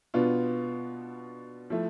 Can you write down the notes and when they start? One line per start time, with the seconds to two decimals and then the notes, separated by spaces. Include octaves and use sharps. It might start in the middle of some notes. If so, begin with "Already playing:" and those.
0.14 B2 B3 D4 F4
1.70 F3 A3 E4